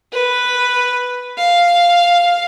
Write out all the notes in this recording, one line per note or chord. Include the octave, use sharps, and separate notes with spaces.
B4
F5